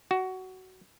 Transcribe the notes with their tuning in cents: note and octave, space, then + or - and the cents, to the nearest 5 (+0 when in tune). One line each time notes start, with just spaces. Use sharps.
F#4 +15